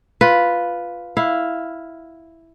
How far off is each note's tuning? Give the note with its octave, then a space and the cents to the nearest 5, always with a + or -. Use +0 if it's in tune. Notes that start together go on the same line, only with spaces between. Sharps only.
F4 +0 B4 +0
E4 +0 F5 +0